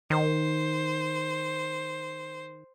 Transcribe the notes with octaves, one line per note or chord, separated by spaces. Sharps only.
D#3 C5